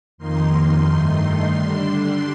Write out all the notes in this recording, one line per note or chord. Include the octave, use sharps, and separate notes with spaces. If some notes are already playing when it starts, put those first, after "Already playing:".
F2 D#3 A#3 D#4 C6
G2 D#3 A3 D#4
D3 G3 D4 C6
C6